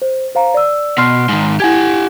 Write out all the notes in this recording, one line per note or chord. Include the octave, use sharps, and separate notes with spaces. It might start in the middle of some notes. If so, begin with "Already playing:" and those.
C5
C5 F5 A#5
D5 E6
B2 C6 F6 C7
G#2 D#3
E4 G4 F#5 G#5 G#6